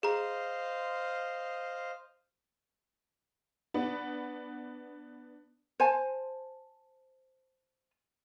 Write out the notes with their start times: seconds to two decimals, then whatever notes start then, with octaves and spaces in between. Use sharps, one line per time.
0.03 G#4 C5 D#5 F5 A#5
3.74 B3 D4
5.80 C5 G#5 A5